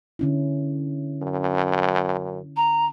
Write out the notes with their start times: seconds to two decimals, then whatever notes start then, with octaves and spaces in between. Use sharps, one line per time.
0.19 D3 C#4 E4
1.22 F#2
2.56 A#5